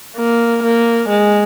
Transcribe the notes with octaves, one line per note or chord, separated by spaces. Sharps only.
A#3
A#3
G#3